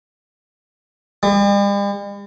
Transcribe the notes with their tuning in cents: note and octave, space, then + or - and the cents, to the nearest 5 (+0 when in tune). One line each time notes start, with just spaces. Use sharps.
G3 +45